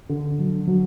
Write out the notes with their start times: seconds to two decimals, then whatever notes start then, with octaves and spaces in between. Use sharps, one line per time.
0.09 D3
0.39 F#3
0.67 F#3